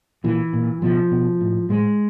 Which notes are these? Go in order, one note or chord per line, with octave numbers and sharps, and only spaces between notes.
A#2 E3
A#2
B2 F3
B2
A2
A2 G#3